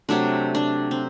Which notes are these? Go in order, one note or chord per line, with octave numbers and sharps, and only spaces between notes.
C3 F#3 A3 D4
D4
C4